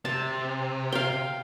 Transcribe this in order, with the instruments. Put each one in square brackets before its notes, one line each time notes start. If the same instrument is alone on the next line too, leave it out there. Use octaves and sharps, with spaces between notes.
[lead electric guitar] C3 [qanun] A5
[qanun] F5 G5